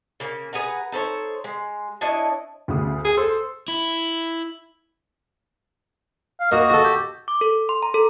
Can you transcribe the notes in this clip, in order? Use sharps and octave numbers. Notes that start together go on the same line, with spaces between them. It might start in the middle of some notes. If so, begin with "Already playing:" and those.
C#3 A#3
G#4 B4 F#5 A#5
D#4 A4 C5 C#5
G#3
D4 E4 C#5 D#5
D2 C#3 D#6
G#4
A4 C5
E4
F5
A#3 F#4 D#5
F#4 A4
G4
D6
A4
C6
A#5
A4